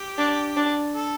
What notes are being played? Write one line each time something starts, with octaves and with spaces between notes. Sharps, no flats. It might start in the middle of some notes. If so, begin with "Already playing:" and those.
Already playing: G4
D4
D4
A4